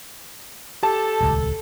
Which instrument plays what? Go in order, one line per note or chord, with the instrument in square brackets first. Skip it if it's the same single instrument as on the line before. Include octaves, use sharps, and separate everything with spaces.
[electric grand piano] G4 A5 [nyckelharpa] A4
[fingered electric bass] D#1 C#2